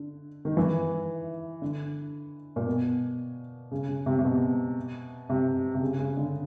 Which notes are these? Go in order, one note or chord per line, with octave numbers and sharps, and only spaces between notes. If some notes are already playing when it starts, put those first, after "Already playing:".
Already playing: D3
D#3
E3
D3
A#2
B2
C#3
C#3
C3
C3
B2
C3
C3
C#3
C#3
D3